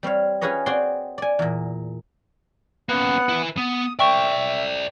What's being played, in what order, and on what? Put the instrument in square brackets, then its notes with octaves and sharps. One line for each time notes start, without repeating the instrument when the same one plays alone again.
[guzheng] G3 C4 C#5 F5
C#4 F4 G#4 B4 C#5 D#5
C4 F#4 G#4 D5 G5 C6
D5 G#5
E2 A#2
[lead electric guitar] A#3 C#4 [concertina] B3 F#5
[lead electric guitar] E4 B4
[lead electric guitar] B3 [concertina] D#6
[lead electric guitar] C5 D5 [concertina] E5 [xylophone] G5 C#6